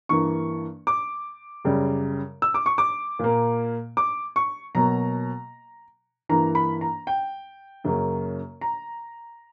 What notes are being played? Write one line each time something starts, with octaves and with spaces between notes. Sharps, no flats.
G2 E3 A#3 C#6
D6
F#2 C#3 G3
E6
D6
C#6
D6
A#2 A#3
D6
C#6
B2 F#3 A#3 A#5
G2 E3 A#3 A#5
B5
A#5
G5
F#2 C#3 F#3 A#3
A#5